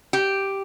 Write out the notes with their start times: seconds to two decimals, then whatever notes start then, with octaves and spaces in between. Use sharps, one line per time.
0.13 G4